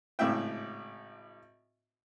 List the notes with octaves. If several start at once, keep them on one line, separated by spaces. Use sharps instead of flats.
G#1 A2 C#3 E4 E5 G5